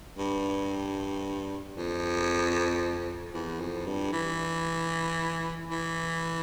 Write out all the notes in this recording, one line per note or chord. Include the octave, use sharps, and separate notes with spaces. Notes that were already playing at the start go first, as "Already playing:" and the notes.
G2
F2
E2
F2
G2
E3
E3